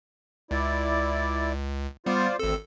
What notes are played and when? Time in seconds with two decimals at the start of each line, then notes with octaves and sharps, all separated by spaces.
0.51 C#2 E4 D5
2.06 G3 B3 F4 C5 D5
2.39 G#1 D2 C4 A4 E6